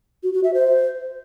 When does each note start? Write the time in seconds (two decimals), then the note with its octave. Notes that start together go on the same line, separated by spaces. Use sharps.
0.23 F#4
0.34 F#4
0.44 E5
0.54 C5